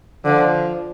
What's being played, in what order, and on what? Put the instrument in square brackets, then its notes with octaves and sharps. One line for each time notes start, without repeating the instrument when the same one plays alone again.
[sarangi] D3 [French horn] F3